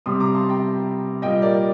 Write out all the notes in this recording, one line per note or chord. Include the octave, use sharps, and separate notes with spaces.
C3 G3 C6 D#6
A#5 D6
A5 C6
A5
G5 A#5
A#2 G3 D#5 G5
A#4 D5